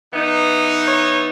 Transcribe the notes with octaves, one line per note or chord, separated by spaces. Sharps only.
E3 B3 D#4
C#5